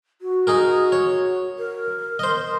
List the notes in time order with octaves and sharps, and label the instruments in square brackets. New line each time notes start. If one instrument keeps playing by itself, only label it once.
[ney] F#4
[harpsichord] D#4 G#4 A#4
C#5
[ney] A#4
[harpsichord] C5 D#5